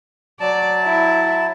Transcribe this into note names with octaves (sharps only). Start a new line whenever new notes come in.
F#3 D5 A5
E4